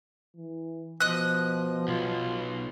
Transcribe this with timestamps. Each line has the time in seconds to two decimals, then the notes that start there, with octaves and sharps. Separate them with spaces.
0.36 E3
1.00 B2 F3 D#5 F#6
1.88 B1 F4